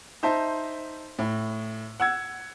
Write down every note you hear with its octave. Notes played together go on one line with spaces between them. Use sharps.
D#4 C5 E5 A5
A2
F#5 E6 G#6